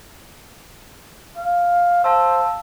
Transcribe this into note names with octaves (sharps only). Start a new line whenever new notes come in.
F5
C5 F5 A5 E6